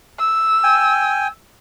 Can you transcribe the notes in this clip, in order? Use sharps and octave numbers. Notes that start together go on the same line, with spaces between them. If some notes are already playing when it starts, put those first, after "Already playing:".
E6
G5 G#5